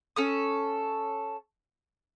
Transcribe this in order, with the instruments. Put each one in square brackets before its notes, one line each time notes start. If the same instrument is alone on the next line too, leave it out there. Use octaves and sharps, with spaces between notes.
[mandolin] C#4 A4 D#6